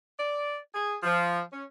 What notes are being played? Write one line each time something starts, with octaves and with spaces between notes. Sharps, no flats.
D5
G#4
F3
C#4